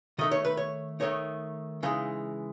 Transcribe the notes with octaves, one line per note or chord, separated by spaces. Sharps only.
D#3 A3 D#4 D#5
C#5
B4
C#5
D#3 A3 D#4 C#5
C#3 E3 G#3 D#4